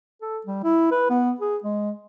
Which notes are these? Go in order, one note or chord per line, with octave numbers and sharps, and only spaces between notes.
A4
G3
E4
B4
B3
G#4
G#3